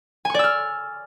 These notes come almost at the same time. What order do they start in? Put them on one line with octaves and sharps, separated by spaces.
G#5 C#6 D5 E6 F6